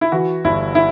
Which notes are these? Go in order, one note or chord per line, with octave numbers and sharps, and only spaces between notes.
E4
E3 F#4
G1 E4
E4